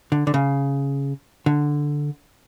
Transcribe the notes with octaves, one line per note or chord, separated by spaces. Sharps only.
D3
D3
C#3
D3